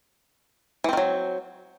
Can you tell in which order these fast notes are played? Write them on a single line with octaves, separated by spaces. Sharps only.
E3 C4 D#3 F#3